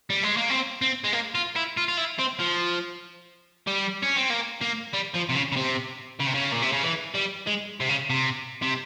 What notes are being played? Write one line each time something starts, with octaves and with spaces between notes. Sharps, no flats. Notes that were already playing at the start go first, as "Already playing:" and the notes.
G3
G#3
A#3
C4
C4
G#3
A#3
F4
E4
F4
F4
E4
C4
F3
G3
C#4
C4
A#3
A#3
G3
F3
C3
C#3
C#3
C3
C#3
C3
C#3
A#2
C3
C#3
E3
G3
G#3
C3
C#3
C3
C3